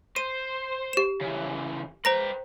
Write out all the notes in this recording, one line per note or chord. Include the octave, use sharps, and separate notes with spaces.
C5 D#7
G4 E7
C#3 E3
B4 C5 G5 A#5 A#6